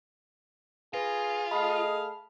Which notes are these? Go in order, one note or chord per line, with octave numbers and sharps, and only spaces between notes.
F4 G#4 B4 A#6
A3 G#4 D#5 F5 A5 B5